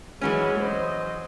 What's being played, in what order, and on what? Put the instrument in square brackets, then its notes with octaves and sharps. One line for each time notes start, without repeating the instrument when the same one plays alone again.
[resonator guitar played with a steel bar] E3 F#3 C#4 [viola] G#3 B5
[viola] C5 D#5